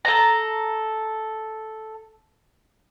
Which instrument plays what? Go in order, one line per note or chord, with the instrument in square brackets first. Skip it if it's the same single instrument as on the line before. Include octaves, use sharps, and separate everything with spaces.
[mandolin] A4 A#5